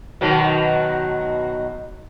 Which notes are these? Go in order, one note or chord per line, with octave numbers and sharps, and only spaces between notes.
B2 D#3 F#3